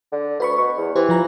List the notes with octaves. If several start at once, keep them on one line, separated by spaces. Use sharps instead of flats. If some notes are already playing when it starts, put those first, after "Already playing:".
D3
D2 B4 B5 C#6
B2 C#6
E2
E3 G4 C5
F3 F4 A#5